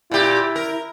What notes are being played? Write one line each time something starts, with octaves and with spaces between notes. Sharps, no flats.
A#2 E4 G4
A#4